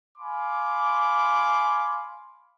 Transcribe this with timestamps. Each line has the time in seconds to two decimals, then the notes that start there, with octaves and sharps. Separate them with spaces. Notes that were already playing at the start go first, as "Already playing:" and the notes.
0.17 F5 G#5 B5 C6 D6